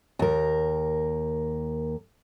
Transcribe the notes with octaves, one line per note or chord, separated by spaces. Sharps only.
D#2 A#4